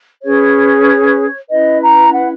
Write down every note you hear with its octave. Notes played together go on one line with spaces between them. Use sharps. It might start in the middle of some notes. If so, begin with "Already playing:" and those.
C#4 G#4 B4 C#5
C#4 E4 B4 D#5
A#5
F#5